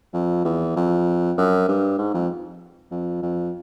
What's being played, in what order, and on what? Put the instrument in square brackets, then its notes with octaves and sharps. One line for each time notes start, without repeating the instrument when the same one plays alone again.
[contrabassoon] F2
E2
F2
F#2
G2
G#2
F2
F2
F2